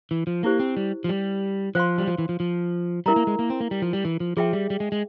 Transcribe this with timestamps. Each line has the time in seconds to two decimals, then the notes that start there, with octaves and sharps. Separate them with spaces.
0.11 E3
0.27 F3
0.43 A#3 E4 G4 C5
0.59 C4
0.77 G3
1.04 F3
1.09 G3
1.75 F3 C5 F5 C6
1.98 G3
2.07 F3
2.18 E3
2.29 F3
2.40 F3
3.06 G3 E4 A#4 E5 A#5
3.16 A#3
3.27 G#3
3.39 A#3
3.50 C4
3.60 A#3
3.71 G3
3.82 F3
3.93 G3
4.05 E3
4.20 F3
4.37 F3 G#4 E5 G5
4.53 G3
4.70 G3
4.80 G#3
4.92 G#3